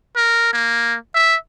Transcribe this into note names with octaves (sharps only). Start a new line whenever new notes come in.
A#4
A#3
E5